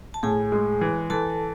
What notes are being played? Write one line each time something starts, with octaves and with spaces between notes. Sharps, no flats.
A5
A2 G#4 G#5
G#3
E3
E3 A4 A5